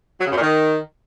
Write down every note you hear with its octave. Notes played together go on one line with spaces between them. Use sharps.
F#3
C#3
F#2
A#2
D#3